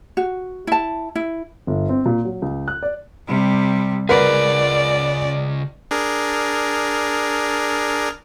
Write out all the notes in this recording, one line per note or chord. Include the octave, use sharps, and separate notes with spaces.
F#4
E4 A5
E4
G1
C4
A#2
F#3
C#2
F#6
D5
C3 G3
C#3 F4 G#4 A#4 B4 D5 F#5
D4 G#4 A#4